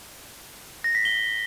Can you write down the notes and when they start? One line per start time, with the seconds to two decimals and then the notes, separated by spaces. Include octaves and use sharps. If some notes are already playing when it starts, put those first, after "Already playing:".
0.84 A#6
0.95 B6
1.05 G7